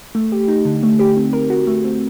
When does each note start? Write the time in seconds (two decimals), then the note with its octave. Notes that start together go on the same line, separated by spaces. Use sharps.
0.15 A3
0.32 G4
0.48 D#4
0.65 D3
0.83 A3
0.99 G4
1.17 C4
1.33 A#4
1.50 F#4
1.67 A3
1.84 C4